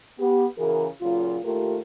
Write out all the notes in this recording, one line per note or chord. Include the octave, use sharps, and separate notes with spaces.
B3 G4
C#3 E3 F#4 G#4 A#4
A#2 C#3 F#3 F4
D#2 A3 F4 G4 A#4